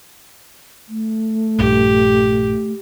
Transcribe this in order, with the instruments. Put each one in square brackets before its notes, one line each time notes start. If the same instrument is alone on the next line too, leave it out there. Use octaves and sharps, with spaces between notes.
[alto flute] A3
[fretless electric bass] A#1 G2 [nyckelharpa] G4